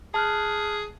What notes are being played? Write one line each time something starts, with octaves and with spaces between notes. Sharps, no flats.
G#4 A5 F6 F#6